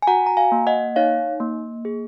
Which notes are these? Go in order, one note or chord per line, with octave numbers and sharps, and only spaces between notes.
G#5
F#4 F#5 A#5
A#5
F5 G#5
A#3
D#5 F#5
D#4 C#5 F5
A#3
G#4